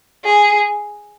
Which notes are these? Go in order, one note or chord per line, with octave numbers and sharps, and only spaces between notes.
G#4